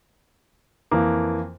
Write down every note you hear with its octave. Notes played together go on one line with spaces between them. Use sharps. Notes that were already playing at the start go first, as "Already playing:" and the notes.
F2 E3 A#3